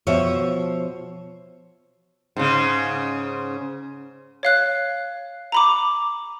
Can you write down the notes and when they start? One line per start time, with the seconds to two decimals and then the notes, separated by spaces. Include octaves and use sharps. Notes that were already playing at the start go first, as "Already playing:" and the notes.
0.07 B2 F3 C5 C#5 E5
2.36 G#2 C#3
4.43 C#5 F5 F#6
5.52 A#5 B5 D6